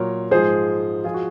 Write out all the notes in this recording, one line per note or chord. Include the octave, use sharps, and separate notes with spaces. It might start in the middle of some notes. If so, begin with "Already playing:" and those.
Already playing: A#2 F#3 A#4 C#5
G#2 F3 G#4 C5
F3 F4 G#4
F#4